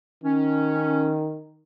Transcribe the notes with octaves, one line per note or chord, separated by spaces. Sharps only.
D#3 C#4